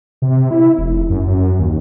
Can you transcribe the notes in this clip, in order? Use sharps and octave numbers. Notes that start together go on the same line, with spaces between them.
C3
E4
F1
F#2
F#2
D#2